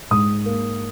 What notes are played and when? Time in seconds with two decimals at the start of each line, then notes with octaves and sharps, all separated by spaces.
0.11 G#2 D#6
0.46 A#3